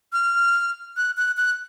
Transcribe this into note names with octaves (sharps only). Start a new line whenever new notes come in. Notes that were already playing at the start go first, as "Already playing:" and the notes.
F6
F#6
F#6
F#6